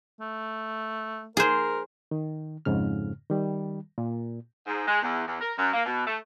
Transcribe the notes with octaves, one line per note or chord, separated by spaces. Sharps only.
A3
G#4 A#4 C5
D#3
F2 G#2 C#3 F6
D#3 G3
A#2
G#2
G#3
E2
E2
A#4
F#2
A#3
B2
A3